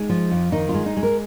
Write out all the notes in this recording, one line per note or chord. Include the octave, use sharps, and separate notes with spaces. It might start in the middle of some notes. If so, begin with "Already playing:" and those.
Already playing: G#3 D#4
F3
F2
D#3 D#4
F4
G#3
D#4
G#3
A#4